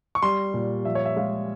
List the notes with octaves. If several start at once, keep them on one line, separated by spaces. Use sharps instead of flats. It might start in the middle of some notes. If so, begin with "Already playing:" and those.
C#6
G3 C6
A#2
F3 E5
C#5
E5
G#3 F5